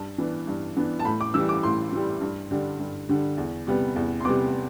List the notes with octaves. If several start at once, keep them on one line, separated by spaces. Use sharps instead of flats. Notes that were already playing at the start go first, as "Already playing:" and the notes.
Already playing: G2 A5
E3 B3 D4
G2
E3 B3 D4
A5
A2 B5
D6
E3 G3 E6
D6
A2 C6
E3 G3
G2
D3 G3 D4
G2
D3 G3 D4
E2
C3 G3 B3
E2
C6
C3 G3 B3 D6